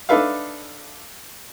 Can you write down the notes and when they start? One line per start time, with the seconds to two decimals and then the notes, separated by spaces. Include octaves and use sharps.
0.09 D4 D#4 A4 B4 E5 F5